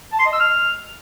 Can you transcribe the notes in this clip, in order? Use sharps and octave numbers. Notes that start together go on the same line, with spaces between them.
A5
C6
D#5
E6
F6